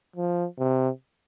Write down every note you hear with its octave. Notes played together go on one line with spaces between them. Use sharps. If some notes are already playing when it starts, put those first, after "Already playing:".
F3
C3